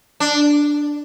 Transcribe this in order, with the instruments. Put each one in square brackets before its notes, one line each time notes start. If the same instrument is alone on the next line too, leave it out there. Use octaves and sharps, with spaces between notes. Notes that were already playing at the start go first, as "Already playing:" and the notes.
[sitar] D4